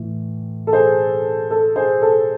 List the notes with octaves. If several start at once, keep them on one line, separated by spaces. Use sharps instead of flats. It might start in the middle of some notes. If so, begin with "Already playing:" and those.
Already playing: A2 E3
A4
G#4 C5
A4
G#4 C5
A4